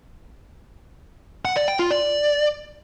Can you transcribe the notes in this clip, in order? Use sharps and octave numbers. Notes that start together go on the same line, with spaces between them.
F#5
D5
G5
F4
D5